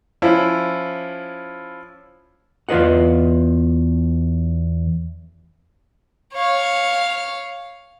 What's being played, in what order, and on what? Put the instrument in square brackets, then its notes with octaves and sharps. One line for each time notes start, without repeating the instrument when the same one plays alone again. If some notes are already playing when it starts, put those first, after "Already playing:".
[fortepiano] F3 C#4 E4
[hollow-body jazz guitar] E2 F4 B4 D#5 F#5
[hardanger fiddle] C#5 F5